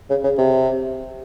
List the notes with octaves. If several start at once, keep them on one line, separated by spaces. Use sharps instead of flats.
C#3
C#3
C3